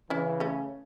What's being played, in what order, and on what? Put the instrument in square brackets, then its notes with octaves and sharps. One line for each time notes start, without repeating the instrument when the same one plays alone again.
[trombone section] C#3 E3 [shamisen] C#4 E4
[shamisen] A3 C#4